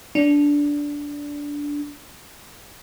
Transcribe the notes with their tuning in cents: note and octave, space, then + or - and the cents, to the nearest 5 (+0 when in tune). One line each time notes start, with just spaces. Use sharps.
D4 -15